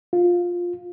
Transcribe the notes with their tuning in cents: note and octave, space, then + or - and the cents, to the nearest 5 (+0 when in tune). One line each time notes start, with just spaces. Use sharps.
F4 +10